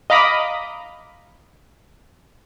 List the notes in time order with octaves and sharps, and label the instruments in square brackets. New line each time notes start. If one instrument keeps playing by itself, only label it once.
[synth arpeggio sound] D#5 F5 A#5 B5 D6 D#6